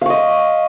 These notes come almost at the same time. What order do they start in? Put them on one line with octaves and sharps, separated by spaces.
F5 C#6 D#5